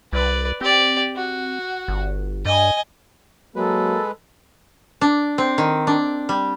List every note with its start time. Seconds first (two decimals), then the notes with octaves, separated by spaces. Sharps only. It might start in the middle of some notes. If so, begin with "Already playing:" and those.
0.13 C2 B4 D5
0.61 C4 G4 D5
1.16 F#4
1.88 G1
2.45 G2 D#5 G#5
3.56 F#3 G#3 A#3 A4 B4
5.01 D4
5.38 C4
5.58 D#3
5.87 D4
6.29 G3